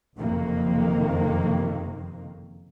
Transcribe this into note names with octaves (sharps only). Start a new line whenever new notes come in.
F#1 F2 C3 D#3 A#3